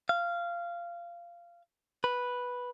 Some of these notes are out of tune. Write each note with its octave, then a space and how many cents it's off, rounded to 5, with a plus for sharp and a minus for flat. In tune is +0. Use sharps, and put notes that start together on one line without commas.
F5 -15
B4 -5